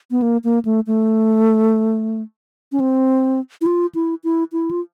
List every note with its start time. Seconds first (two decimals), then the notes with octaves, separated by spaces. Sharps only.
0.11 B3
0.22 A#3
0.44 A#3
0.65 A3
0.87 A3
2.72 C#4
2.80 C4
3.61 E4
3.66 F4
3.95 E4
4.24 E4
4.52 E4
4.71 F4